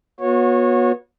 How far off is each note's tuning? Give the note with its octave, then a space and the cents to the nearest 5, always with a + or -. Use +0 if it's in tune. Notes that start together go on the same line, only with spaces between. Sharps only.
B3 -30 F#4 -35 C#5 -15